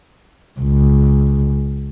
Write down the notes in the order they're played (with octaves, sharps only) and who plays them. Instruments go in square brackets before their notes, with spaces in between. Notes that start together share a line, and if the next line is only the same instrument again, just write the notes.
[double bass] C#2